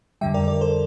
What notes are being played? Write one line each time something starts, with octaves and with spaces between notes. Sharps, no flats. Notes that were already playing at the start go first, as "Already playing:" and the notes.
F2 D3 G3 E5 G5
A#4 D5
A#4 D5
A4 C5